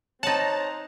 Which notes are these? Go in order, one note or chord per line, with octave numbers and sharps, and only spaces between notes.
C4 D#4 C5 C#5 F#5 A5 A#5